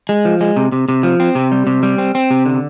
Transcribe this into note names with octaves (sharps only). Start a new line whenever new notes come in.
G#3
F3
G#3
C3
C3
C3
F3
C4
C3
G3
C3
G3
C4
C4
C3
D3